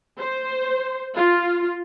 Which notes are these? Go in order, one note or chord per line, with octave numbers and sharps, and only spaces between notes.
C5
F4